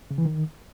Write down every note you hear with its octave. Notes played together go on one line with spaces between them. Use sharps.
C#3
E3
D#3